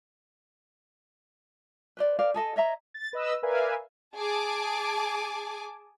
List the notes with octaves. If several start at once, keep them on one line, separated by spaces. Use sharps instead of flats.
B4 C5 D5
A#4 C5 D5 F5
G#4 A4 D#5 A5
C#5 D#5 E5 A#5
A6
B4 D#5 E6
A#4 B4 D5 E5 F5 G#5
G#4 G#5 A5 D6